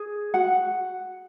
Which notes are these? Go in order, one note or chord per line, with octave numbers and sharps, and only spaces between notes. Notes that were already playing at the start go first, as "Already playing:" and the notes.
Already playing: G#4
F#4 F#5